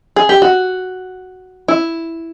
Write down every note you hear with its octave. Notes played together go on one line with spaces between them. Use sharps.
G#4
G4
F#4
E4